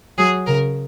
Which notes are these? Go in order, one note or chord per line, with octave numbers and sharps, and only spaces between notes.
F#3 G#4
C#3 A#4